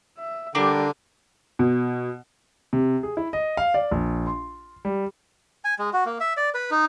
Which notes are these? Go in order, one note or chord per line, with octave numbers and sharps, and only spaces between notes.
E5
D3 G3 D4 A#4 G5 D6
B2
C3
G#4
E4
D#5
F5
D5
A#1
C6
G3
G#5
G#3
F#4
A#3
E5
D5
B4
D#4